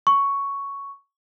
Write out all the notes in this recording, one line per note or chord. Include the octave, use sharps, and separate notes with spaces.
C#6